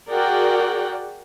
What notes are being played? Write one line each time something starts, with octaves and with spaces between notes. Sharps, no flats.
F#4 G#4 A#4 D5 F#5 G5